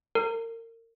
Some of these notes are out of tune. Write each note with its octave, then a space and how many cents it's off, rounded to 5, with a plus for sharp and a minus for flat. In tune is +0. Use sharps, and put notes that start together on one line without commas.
A#4 -30